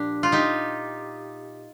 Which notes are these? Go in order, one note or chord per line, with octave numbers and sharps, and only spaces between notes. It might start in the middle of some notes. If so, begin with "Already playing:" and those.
Already playing: A#2 F3 D4 G4
F4
D#4 G4